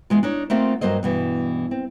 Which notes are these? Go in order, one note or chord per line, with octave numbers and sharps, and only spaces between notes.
E2 G#3 F4
D4 D#4 C#5
A3 A#3 C4 D#4 F4 F#5
G2 F#3 A#3 C5 D#5
G2 B2 E3
C4